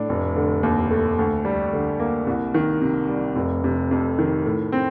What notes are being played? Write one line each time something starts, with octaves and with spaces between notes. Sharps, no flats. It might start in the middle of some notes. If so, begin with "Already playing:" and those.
Already playing: A2 D4
F1
D3
D#2
A3
D2
G3
D3
A#3
C2
D#3
C3
G3
F1
C3
F2
D#3
A2
C4